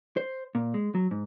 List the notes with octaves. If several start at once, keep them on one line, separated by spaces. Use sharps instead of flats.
C5
A#2
G#3
F#3
G#2